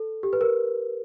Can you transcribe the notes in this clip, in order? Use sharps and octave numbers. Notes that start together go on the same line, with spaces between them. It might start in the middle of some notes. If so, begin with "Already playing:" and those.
Already playing: A4
G4
B4
A#4